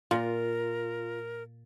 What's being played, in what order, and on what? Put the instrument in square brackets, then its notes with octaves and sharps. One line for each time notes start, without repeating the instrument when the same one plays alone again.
[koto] A#2 [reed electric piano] F4 [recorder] A#4